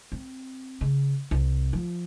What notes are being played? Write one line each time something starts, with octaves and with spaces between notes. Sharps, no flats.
C4
C#3
C2
F3